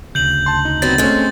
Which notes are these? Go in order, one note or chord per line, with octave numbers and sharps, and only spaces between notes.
D2 C#3 G6 F#7
A5 C6
D#4
F#3 B3 C4 A6
G#3 A3 C4 C#4